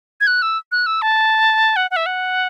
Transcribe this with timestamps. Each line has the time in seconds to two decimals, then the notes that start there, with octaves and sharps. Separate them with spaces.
0.21 G#6
0.27 F#6
0.42 E6
0.72 F#6
0.86 E6
1.02 A5
1.76 F#5
1.91 F#5
1.96 E5
2.06 F#5